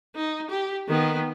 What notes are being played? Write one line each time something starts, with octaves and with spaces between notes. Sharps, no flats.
D#4
G4
D#3 B3